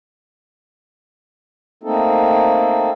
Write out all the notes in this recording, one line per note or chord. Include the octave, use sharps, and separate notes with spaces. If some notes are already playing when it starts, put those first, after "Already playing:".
A3 A#3 C4 D#4 A4